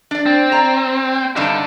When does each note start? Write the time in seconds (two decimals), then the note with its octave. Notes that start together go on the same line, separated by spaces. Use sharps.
0.11 D4 D5
0.26 C4
0.52 D5 A#5
1.36 G2 C3 D4 D#4 A4